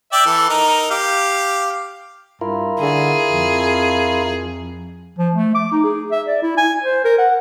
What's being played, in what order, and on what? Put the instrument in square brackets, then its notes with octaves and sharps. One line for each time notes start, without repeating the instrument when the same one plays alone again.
[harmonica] D5 E5 G5
E3 A4
D#4 A#4
G4 F5
[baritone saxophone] G2 [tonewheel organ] E4 F4 A#4
[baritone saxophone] D3 [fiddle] G#4
[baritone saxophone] F2
[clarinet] F3
A3
D6
D#4
G#4
E5
D5
E4
G#5
C5
A#4
F#5